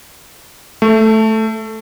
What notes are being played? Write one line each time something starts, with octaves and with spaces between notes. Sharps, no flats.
A3